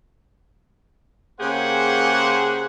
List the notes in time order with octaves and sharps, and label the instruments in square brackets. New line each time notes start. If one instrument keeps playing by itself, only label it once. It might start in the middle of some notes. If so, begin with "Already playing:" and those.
[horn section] C#3 A#3 G4 G#4 C5 F#5